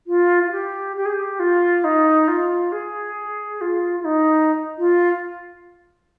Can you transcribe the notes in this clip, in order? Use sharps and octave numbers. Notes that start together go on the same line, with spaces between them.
F4
F4
G4
G4
G#4
G4
F4
D#4
F4
G#4
F4
F4
D#4
F4